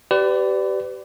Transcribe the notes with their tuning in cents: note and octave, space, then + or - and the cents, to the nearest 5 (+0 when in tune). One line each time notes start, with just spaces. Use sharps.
G4 -25 B4 +35 D5 +0